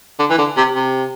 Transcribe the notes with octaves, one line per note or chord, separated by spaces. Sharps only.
D3
E3
D3
C3
C3